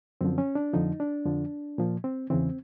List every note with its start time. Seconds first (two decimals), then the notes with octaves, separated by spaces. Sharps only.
0.21 F#2 D3 F3 C4
0.38 C#4
0.55 D4
0.73 F2 D3 F3 D#4
1.00 D4
1.25 F2 D3 F3
1.78 A#2 F3
2.04 C4
2.30 E2 C#3 E3 C4